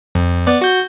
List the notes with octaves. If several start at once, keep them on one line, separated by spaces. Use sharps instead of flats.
F2
B3 D5
F#4 G6